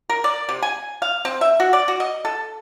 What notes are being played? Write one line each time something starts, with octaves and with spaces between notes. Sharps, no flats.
A#4
D5
C3
G#5
F5
C4
E5
F#4
D5
F#4
D#5
A4